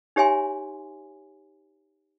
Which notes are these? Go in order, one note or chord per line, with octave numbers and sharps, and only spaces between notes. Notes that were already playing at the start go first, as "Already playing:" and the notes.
D#4 G4 C#5 E5 G#5 C6